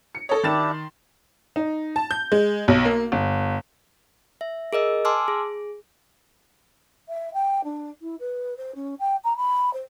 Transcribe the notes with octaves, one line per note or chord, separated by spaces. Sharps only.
C#7
A4 C#5 D#5 D#6
D#3 D4 E4 G4 A6 E7
C6
D#4
A5
G6
G#3
B1
A#3
G1
E5
G#4 A#4 D#5 E6
G#5 A5 C6 D6 E6 F6
G#4
E5
G5
D4
E4
B4
C5
C#4
G5
A#5
B5
C5